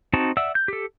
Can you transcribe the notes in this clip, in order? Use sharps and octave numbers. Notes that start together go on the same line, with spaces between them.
C4 D#4 F#4 A5
D5 E5 F#5 E6
G6
G4 A4